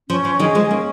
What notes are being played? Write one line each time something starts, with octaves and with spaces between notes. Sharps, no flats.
F3 C#4
F3
D#3 F#3 G#4 D#5 G#5
F3 G#3
A#3 C#4